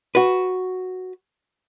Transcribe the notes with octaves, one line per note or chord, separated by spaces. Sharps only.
F#4 B4